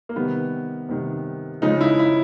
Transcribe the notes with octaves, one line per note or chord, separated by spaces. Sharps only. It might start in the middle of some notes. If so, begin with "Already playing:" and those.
A#3
C3 D#3 G3 B3
C3 D#3 G3
C#3 F3 G#3 D#4
E4
E4